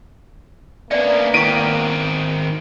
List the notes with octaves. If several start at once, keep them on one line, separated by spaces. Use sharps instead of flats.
A#3 B3 C#4 D4 D5 E5
D#3 C4 E4 F5 C#6 D7 D#7